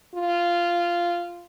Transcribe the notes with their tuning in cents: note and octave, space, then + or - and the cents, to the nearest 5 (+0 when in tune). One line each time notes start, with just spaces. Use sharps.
F4 -10